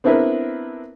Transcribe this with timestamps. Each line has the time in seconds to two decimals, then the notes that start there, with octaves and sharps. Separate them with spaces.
0.04 B3 C4 D4 E4 A#4 B4